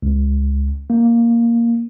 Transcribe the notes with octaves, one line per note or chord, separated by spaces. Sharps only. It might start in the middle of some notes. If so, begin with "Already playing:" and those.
C#2
A#3